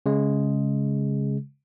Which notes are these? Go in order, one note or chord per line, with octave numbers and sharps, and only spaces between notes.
C#3 G#3